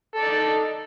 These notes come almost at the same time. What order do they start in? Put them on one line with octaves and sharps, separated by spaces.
A4 D5 D#4